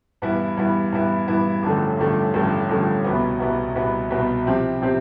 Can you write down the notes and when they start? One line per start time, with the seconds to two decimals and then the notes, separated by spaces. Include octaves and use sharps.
0.22 G2 E3 B3 E4
0.57 G2 E3 B3 E4
0.92 G2 E3 B3 E4
1.28 G2 E3 B3 E4
1.63 A1 G2 D3 F3 A3
1.98 A1 G2 D3 F3 A3
2.34 A1 G2 D3 F3 A3
2.69 A1 G2 D3 F3 A3
3.04 C2 B2 B3
3.40 C2 B2 B3
3.75 C2 B2 B3
4.10 C2 B2 B3
4.46 C3 F3 C4 G4
4.82 C3 F3 C4 G4